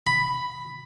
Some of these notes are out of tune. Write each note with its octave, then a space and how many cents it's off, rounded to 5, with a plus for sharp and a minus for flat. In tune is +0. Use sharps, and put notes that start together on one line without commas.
B5 +5